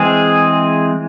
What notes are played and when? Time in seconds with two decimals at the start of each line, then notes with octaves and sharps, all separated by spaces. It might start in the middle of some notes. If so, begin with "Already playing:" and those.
Already playing: E3 G#3 C4 G#4